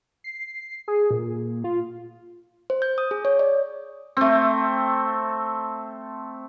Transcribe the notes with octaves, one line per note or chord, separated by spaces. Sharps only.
C7
G#4
A#2
F4
C5
G6
D#6
G#4
C#5
D5
A3 C4